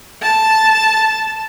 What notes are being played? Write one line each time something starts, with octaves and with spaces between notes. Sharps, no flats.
A5